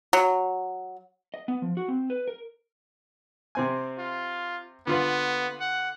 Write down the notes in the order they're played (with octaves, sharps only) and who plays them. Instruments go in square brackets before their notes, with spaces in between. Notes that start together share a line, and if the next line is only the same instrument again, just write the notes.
[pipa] F#3
[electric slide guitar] D#5
B3
F3
F#4
C4
B4
A#4
[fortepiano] C3 C4 G#5
[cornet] F4
[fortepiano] D3 F4 B4 [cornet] B3
[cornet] F#5